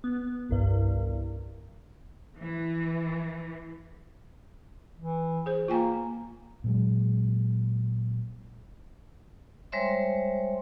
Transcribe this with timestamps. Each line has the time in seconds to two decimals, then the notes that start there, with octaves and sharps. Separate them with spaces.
0.04 B3
0.49 G1 C2 G2
2.39 E3
4.97 E3
5.46 G#4 C5
5.68 A#3 F4 G5 G#5
6.64 A#2 F#3 G#3
9.72 G3 G#3 C5 C#5 E5 C6